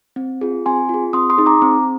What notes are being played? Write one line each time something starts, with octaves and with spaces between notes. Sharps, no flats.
C4
F4 G#4
C4 G#5 C6
F4 G#4
C4 C6 D#6
C6 D#6
D#4 G#4
A#5 D6
C4